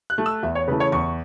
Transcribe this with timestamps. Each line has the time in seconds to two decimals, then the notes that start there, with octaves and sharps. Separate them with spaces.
0.10 F#6
0.18 A3
0.26 E6
0.43 E2 E5
0.55 C#5
0.67 C#3 E3 A3 B4
0.80 C#5
0.92 E2 C#6